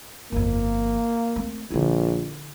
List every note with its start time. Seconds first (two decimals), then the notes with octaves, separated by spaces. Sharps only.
0.32 G1 F2 A#3
1.36 A3 C4
1.71 A#1 D3 E4